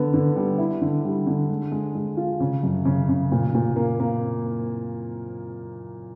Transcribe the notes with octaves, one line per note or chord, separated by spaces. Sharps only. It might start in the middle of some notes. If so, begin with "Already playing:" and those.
Already playing: D3 B3
D3
G3
E4
D3
G3
D3
G#3
G#3
G#3
F4
C#3
F#2
C#3
C#3
A#2
A#2
A#3
A#3